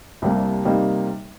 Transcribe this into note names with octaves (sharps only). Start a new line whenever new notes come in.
C2 C3 G3 A#3
C3 G3 A#3 D#4